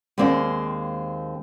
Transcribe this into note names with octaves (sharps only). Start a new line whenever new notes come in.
D#2 G#3 A#3 C4 D5